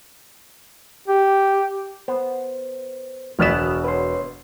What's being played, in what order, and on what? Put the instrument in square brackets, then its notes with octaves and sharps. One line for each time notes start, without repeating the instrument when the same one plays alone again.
[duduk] G4
[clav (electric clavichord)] B3 [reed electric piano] C5
[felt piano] E1 D5 E7 [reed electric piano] C#2 F6 F#6 [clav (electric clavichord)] B2 B3
[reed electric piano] B4 C#5 C6